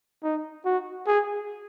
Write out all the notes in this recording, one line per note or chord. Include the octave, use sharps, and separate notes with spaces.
D#4
F#4
G#4